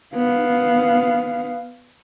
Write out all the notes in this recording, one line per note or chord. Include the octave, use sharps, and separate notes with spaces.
B3 F5